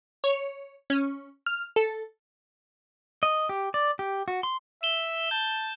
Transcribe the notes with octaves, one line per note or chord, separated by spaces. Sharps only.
C#5
C#4
F6
A4
D#5
G4
D5
G4
F#4
C6
E5 E7 G7
A5 G6